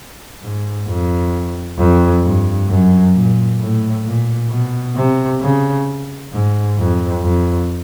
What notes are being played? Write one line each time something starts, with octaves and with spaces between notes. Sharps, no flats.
G#2
F2
F2
G2
F#2
A#2
A2
A#2
B2
C3
C#3
G#2
F2
F2